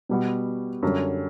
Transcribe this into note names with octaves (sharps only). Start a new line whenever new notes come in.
B2 G3 B3 F#4
F#2 D3 G3 C#4